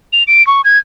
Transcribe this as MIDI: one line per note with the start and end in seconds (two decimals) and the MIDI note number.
0.13 0.24 101
0.27 0.45 98
0.47 0.61 85
0.64 0.79 92